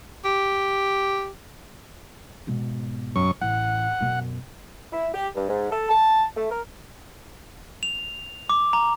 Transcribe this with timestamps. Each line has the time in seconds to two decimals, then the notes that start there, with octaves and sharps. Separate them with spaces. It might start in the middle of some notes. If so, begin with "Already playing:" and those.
0.25 G4
2.47 G#2 B2
3.16 F#2 C#6
3.42 A1 F#5
4.01 F#2 B2
4.92 E4
5.14 G4
5.35 G2
5.48 G#2
5.70 A4
5.88 A5
6.36 A3
6.51 A#4
7.83 F7
8.50 D6
8.73 A#5